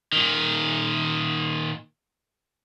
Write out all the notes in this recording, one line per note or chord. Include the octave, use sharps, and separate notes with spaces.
A#2 D#3